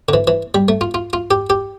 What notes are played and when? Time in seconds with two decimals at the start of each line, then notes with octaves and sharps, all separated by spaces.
0.09 D3
0.14 E3
0.27 E3
0.55 G3
0.68 A3
0.81 F4
0.94 F4
1.13 F4
1.31 G4
1.50 G4